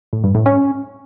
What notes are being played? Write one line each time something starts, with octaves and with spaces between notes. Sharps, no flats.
A2
G2
A2
C#4